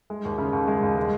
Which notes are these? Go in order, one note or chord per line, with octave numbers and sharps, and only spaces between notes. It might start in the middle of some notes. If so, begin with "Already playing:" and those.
G#3
D#2
C#3
D#2
G#3
D#2
G#3